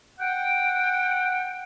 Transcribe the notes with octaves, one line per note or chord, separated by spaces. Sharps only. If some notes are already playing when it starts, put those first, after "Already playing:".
F#5 G5